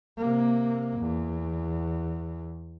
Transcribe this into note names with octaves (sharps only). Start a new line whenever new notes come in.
C3 A#3
E2